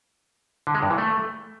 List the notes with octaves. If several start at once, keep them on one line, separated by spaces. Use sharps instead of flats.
D3
G#3
G2
E3
A3